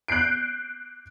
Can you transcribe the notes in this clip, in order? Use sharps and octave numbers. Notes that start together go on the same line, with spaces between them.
F#6 G6 C7 D7